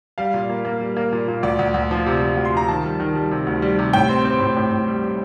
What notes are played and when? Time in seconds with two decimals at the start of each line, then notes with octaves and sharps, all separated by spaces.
0.18 G3 F5
0.34 A#2
0.50 A#3
0.65 A#3
0.81 G3
0.97 A#3
1.12 A#2
1.28 A#2
1.43 D2 D5
1.59 D2
1.74 D2
1.91 F3
2.07 C3
2.22 F3
2.37 D2
2.45 C6
2.53 F3 A#5
2.68 D#3 A5
2.85 G3
3.00 D#3
3.15 G3
3.31 C3
3.47 D2
3.62 G3
3.79 C3
3.93 A2 G5
4.09 C4
4.25 C4
4.40 A2
4.56 A2
4.71 A2
4.88 G3
5.03 G3